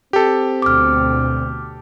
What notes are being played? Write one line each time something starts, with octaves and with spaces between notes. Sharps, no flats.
C4 G4 A4
D2 B2 D6 F6